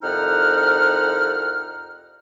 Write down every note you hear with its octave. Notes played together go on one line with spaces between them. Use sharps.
C2 F2 D#4 F#5 F6